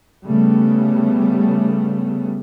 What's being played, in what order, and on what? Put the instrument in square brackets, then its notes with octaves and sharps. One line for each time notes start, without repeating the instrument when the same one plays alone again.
[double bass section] C#3 G3 A3 B3